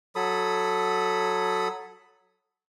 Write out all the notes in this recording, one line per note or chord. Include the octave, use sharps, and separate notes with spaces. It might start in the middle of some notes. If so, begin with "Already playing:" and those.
F#3 A4 B5 D#6